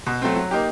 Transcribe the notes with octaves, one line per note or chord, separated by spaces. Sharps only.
B2
F#3 A3 C4
F#3
A#3 D#4 G4